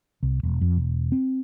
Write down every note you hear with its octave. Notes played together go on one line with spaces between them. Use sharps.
C2
E1
F2
E1
C4